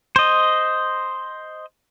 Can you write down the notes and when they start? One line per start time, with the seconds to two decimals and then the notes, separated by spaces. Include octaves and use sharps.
0.16 C5 D#5